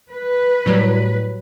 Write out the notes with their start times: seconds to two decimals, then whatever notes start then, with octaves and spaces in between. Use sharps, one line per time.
0.10 B4
0.66 A2 F#3 G3